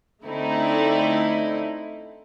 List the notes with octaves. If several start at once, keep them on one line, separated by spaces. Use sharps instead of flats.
D3 A3 C4 D#4 E4